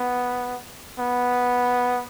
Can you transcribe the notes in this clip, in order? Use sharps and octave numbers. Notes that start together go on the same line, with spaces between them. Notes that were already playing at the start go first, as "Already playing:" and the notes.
Already playing: B3
B3